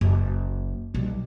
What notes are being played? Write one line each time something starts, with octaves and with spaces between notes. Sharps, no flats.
F#1
B1 G3